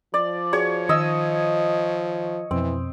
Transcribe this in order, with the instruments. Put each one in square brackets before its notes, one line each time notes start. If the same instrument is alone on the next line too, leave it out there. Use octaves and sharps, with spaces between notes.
[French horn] F3 [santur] D5
[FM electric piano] F#4 G#4 D5 [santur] C#5
[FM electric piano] D#3 [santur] D#5 E6
[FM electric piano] F2 B2 [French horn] E3 [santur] C4